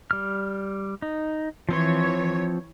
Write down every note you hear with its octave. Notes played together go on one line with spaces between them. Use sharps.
G3 F6
D#4
E3 F3 C4 C#5 C6